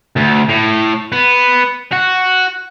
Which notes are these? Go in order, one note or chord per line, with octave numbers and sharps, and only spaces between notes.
D2
A2
B3
F#4